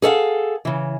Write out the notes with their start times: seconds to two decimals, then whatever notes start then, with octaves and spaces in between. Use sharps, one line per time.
0.02 G#4 A4 C#5 F5 F#5
0.65 C#3 E3